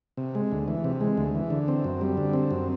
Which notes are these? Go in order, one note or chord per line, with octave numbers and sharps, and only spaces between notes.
C3
G#3
D2
E3
C3
G#3
D2
E3
D3
C4
F#2
G3
D3
C4
F#2